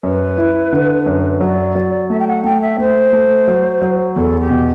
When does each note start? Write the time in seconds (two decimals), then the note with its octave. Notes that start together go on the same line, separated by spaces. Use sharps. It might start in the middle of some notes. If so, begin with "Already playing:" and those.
0.03 F#2 B4
0.38 E4
0.72 D3
1.06 F#2
1.41 F#3 D5
1.75 F#3
2.10 A3 E5
2.19 G5
2.27 F#5
2.44 A3 G5
2.61 E5
2.78 A3 C5
3.13 A3
3.48 F#3
3.82 F#3
4.16 E2 A4
4.39 G4
4.50 B2